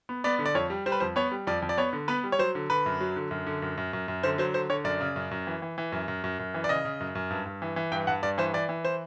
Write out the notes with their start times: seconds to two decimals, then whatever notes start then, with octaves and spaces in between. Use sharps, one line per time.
0.09 B3
0.24 B3 D5
0.39 D3
0.46 D5
0.55 F2 C#5
0.70 G3
0.86 G3 C5
0.92 B4
1.00 F2 C5
1.16 B3 C#5
1.31 G3
1.47 F2 D5
1.62 F2
1.69 D5
1.78 B3 C#5
1.93 D3
2.08 B3 B4
2.24 G3
2.32 C#5
2.39 F#3 C5
2.55 D3
2.70 D3 B4
2.86 F#2
3.01 F#3
3.16 D3
3.31 F#2
3.46 D3
3.62 F#2
3.77 F#2
3.93 F#2
4.08 F#2
4.23 D3 C5
4.38 F#3 C5
4.54 D3 C5
4.69 D3 C#5
4.84 F#2 D5
5.00 C#3
5.16 F#2
5.31 F#2
5.47 E3
5.62 E3
5.78 E3
5.92 F#2
6.08 F#2
6.24 F#2
6.39 F#2
6.54 E3
6.64 D5
6.69 C#3 D#5
6.85 C#3
7.00 F#2
7.15 F#2
7.30 G2
7.46 G2
7.62 E3
7.76 E3
7.92 G2 G5
8.07 G2 F#5
8.23 G2 D5
8.38 E3 C5
8.53 E3 D5
8.69 E3
8.85 C5